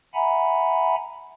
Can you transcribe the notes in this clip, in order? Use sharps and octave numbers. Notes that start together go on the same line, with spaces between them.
E5 F#5 G#5 A#5 B5